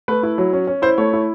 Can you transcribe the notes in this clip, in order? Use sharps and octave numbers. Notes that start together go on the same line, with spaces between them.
A3 B4
E4
F#3
C#4
C#4
E4 C5
A3 C#5
E4